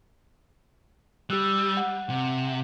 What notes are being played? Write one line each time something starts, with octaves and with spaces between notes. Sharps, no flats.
G3 G4 E6 F#6
F#5
C3 F#5